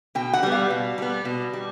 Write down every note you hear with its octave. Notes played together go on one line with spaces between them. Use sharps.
B2 G5
F#5
G3 B3
F5
B2
G3 B3
B2
G3